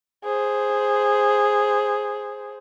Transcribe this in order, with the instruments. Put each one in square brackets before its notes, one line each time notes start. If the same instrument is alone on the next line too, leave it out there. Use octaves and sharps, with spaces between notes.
[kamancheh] G#4 C5